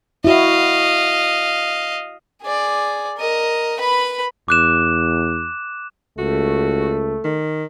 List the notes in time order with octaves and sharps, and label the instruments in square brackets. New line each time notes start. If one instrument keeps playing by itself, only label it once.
[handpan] E4 F#4 [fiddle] D#5 F5
[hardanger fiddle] G#4 D5
A#4 D#5
B4 B5
[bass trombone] E2 [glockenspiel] D6 F#6 E7
[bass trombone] C#2 [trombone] A3 [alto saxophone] F#4
[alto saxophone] D#3